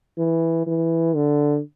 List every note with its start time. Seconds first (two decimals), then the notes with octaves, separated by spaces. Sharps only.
0.18 E3
0.67 E3
1.15 D3